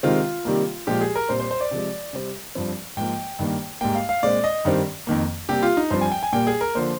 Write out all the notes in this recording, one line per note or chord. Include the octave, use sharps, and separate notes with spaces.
C3 D#3 G#3 C4 F4
C3 D#3 G3 A#3
A#2 F3 G#3 G4
G#4
A#4
A#2 G3 C4 C5
C5
C5
D5
C3 F3 G#3
C3 G3 C4
G2 F3 C4
G#2 F3 A#3 G5
G2 D#3 A#3
G#2 G3 A#3 G5
F5
F5
A#2 G#3 C4 D5
D#5
G2 D#3 G3 C4
F2 D#3 A#3
C3 G3 A#3 G4
F4
D#4
G2 F3 C4 C5
G#5
G5
G#5
A#2 G3 A#3 G5
G#4
A#4
D3 F3 A#3 C5